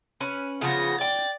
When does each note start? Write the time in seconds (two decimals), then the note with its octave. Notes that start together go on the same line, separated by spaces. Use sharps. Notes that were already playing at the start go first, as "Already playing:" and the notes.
0.20 C#4 B4
0.61 C#3 F3 B3 F4 A#6
1.01 D5 G5 A6